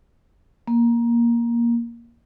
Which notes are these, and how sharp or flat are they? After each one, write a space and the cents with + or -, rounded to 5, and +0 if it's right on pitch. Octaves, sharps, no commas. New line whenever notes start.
A#3 +10